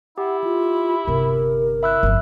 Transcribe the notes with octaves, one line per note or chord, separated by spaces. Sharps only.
E4 G4 F#5
F4
G1 C3 A#4
E4 E5 E6 F#6
G1 F2